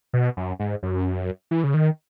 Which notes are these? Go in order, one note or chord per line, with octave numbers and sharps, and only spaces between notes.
B2
F#2
G#2
F#2
E3
C#3
D#3